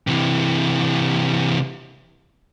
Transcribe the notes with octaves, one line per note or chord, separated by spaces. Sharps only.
C3 E3